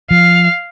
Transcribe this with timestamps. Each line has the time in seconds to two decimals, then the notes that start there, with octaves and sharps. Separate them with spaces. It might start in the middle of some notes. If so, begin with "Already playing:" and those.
0.10 F3 F5